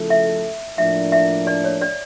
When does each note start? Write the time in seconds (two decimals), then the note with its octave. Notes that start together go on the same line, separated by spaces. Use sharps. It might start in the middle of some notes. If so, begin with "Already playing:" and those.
Already playing: C#3 F3 A3 E4 A4
0.10 E5
0.78 A2 F3 A#3 D4 E5
1.12 E5
1.47 D5
1.64 C#5
1.82 D5